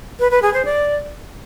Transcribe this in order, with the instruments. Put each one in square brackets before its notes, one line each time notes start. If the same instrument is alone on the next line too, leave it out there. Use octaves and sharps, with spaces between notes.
[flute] B4
B4
G#4
C5
D5